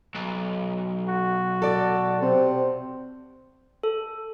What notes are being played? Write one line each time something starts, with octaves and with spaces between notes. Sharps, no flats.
B1
F#4
A4 D5
C3 C5
A4